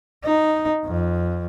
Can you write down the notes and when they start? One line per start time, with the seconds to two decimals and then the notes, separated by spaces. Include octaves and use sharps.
0.24 D#4
0.85 F2